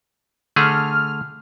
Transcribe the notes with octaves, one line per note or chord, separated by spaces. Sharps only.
D3 A3 G#4 F6